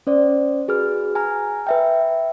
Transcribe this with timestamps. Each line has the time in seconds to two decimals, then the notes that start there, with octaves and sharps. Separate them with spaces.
0.07 C#4 C5 D5
0.68 F#4 G#4 B4 F6
1.15 G#5 A#5 F6
1.67 B4 E5 G5